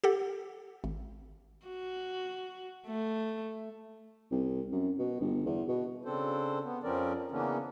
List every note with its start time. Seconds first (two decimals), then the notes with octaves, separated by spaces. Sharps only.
0.04 G4 A4 F#5
0.84 G#1
1.66 F#4
2.87 A3
4.31 C2
4.72 F#2
4.99 B2
5.21 G1
5.46 E2
5.68 B2
6.05 C#3 C4 D4 A4 C5
6.64 B3
6.83 F2 F3 C4 C#4 A#4 D5
7.31 C#3 E3 A#3 B3 C#4 D4